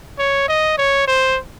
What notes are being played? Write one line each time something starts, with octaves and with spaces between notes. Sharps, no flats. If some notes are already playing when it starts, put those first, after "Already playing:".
C#5
D#5
C#5
C5